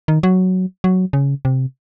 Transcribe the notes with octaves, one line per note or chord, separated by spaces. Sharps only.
D#3
F#3
F#3
C#3
C3